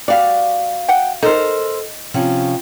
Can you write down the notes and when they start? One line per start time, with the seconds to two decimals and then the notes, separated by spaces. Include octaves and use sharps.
0.08 G3 F#4 D5 F5
0.88 F#5 G5
1.23 D#4 A4 A#4 C5
2.14 C3 F3 C#4